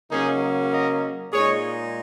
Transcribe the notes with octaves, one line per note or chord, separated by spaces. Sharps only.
C#3 F#3 A#3 C#4 D#4 G#4
A#4 D#5
A#2 G#3 D#4 G#4 C#5